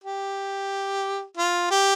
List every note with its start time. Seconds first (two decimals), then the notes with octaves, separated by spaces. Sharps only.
0.04 G4
1.37 F4
1.70 G4